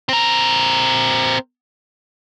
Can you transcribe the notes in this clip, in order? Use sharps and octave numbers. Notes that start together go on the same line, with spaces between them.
C4 A#4